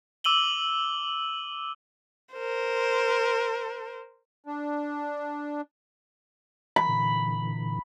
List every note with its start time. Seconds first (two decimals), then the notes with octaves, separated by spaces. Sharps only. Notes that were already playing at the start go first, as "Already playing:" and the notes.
0.24 D6 E6 D#7 F#7 G7
2.33 A#4 C5
4.46 D4
6.76 E3 B5
6.89 A#2 D3 E3